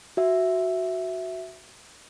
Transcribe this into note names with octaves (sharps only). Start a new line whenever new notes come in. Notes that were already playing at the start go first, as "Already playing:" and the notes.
F#4 E5